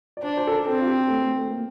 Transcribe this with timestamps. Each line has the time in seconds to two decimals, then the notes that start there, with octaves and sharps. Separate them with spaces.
0.17 D5
0.23 D4 C5
0.37 C5
0.47 A4
0.52 A#4
0.66 C4 A4
0.81 F4
0.88 G4
1.08 A3
1.22 A3
1.36 A3
1.50 A#3